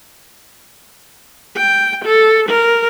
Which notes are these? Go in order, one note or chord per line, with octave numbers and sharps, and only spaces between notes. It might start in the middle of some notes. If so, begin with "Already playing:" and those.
G5
A4
A#4